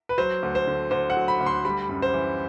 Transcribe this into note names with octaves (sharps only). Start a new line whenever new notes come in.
B4
F#3 C5
D2
C5
D3
D2 C5
F#5
F#3
B5
D2
C6
G3 B5
F#2
C5
E3